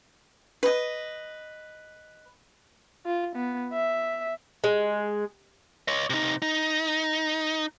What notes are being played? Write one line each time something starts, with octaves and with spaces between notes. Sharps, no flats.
B4 D#5
F4
B3
E5
G#3
C#5 D#5
C3 D#4
D#4